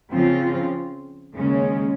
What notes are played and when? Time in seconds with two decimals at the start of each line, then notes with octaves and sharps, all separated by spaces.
0.12 C#3 F3 C4 F4
1.34 D#2 C#3 G#3 C#4